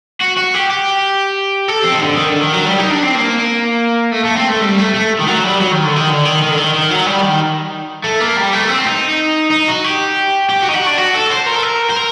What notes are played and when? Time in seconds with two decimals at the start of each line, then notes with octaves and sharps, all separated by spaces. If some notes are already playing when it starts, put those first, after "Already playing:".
0.21 F#4
0.37 F#4
0.54 G4
0.70 G4
1.68 A4
1.84 C4
1.92 D#3
2.01 D3
2.16 D#3
2.29 D3
2.42 D#3
2.54 F#3
2.66 G3
2.78 D#4
2.90 D4
3.03 C4
3.15 A#3
4.12 A3
4.25 A3
4.37 C4
4.50 A3
4.62 G3
4.78 A3
4.94 A3
5.19 D#3
5.27 F#3
5.43 G3
5.60 F#3
5.72 D#3
5.84 D3
5.96 D#3
6.09 D3
6.25 D#3
6.42 D#3
6.50 D3
6.57 D#3
6.74 D#3
6.90 F#3
7.06 G3
7.23 D#3
8.04 A3
8.20 A#3
8.37 G3
8.53 A3
8.69 C4
8.86 D#4
9.51 D#4
9.68 F#4
9.84 G4
10.49 G4
10.62 F#4
10.69 D#4
10.74 F#4
10.86 D4
10.98 F#4
11.15 A4
11.31 C5
11.47 A#4
11.55 A4
11.63 A#4
11.90 C5
11.96 A#4